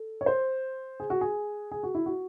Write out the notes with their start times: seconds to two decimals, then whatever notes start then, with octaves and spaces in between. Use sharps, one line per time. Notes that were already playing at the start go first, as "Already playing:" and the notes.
Already playing: A4
0.21 C#5
0.26 C5
1.00 G#4
1.10 F#4
1.21 G#4
1.71 G#4
1.83 F#4
1.94 E4
2.06 F#4